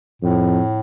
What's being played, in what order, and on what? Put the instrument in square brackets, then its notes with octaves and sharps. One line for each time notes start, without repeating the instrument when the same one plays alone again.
[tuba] F2 [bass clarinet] A2